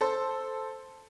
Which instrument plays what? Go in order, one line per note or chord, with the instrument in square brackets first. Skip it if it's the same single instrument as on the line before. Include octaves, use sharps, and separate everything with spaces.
[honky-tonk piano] A4 C5